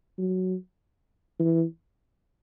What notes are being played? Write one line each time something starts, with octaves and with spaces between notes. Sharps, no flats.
F#3
E3